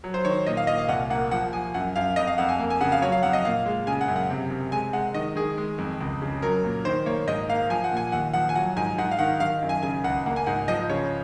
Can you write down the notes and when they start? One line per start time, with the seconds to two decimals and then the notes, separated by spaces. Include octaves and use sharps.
0.04 F#3
0.14 C5
0.25 D#3 C#5
0.46 A#2 D#5
0.57 F5
0.67 A#2 D#5
0.78 F5
0.89 C2 F#5
1.10 A#3 F#5
1.31 F3 F#5
1.53 F3 G#5
1.74 F#2 F#5
1.96 F#2 F5
2.16 F2 D#5
2.27 F5
2.38 F2 F#5
2.49 G#5
2.59 A#3
2.70 G#5
2.81 C#3 F#5
2.92 F5
3.02 F#3 C#5
3.12 F5
3.23 F2 F#5
3.33 D#5
3.45 A#2 F5
3.66 G#3
3.87 C#3 G#5
4.01 F#5
4.08 F#2
4.16 F#5
4.30 C3
4.51 C3
4.72 G#3 G#5
4.93 G#3 F#5
5.14 D#3 D#5
5.35 D#3 G#4
5.58 G#3
5.78 F2
6.01 C#2
6.22 C#3
6.42 F#3 A#4
6.64 A#2
6.85 D#3 C5
7.06 A#3 C#5
7.28 G#2 D#5
7.49 A#3 F5
7.70 F3 G#5
7.84 F#5
7.92 A#2
7.97 G#5
8.12 D#2 F#5
8.33 F3 F#5
8.49 G#5
8.55 F#3 F#5
8.76 G#2 G#5
8.98 G#2 F#5
9.11 F5
9.19 D#3 F#5
9.40 D#3 F5
9.62 F#2
9.69 G#5
9.83 C#3 G#5
10.04 C#2 F#5
10.26 A#3 F#5
10.36 G#5
10.46 G#2 F#5
10.68 F3 D#5
10.90 C#3 C#5